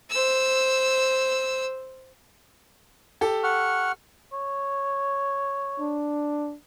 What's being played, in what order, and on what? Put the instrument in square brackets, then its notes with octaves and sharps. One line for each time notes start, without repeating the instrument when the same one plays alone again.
[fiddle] C5 E6
[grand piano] G4 A4
[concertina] F#5 C#6 F6
[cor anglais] C#5
[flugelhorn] D4